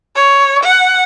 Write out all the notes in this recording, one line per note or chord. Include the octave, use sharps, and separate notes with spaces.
C#5
F#5